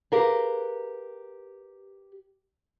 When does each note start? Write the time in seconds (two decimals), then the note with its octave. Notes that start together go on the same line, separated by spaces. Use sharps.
0.12 G4 G#4 A#4 B4 F5